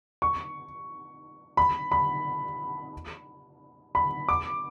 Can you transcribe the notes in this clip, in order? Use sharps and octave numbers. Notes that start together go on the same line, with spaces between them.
C#6
B5
B5
B5
D6